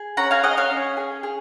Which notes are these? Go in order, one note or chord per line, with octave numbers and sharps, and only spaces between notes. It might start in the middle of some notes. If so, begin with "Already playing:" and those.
Already playing: G#4
C#4 F#5 A#5
F5 G#5
G#4 D#5 F#5
C#5 F5
C#4
G#4
G#4